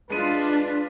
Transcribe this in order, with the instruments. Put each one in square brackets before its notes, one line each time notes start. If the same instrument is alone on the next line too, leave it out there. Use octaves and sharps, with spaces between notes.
[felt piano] G#3 D#7 [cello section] D4 F4 [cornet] B4